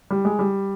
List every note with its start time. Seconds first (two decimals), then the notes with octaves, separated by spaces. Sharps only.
0.11 G3
0.25 G#3
0.39 G3